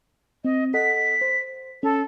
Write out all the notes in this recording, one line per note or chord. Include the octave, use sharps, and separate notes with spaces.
C4 D#5
A4 D#5 F#5 B6
C5
C#4 A4